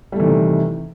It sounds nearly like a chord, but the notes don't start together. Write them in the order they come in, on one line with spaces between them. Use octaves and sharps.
G3 A3 E3 D#3 C3